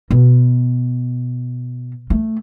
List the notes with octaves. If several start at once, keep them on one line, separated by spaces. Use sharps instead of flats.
B2
A3